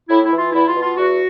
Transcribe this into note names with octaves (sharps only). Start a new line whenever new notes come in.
A2 E4
E4
E3
F4
E2 E4
F4
B2
F4
E2 F#4